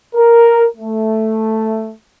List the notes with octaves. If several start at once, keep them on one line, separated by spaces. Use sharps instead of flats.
A#4
A3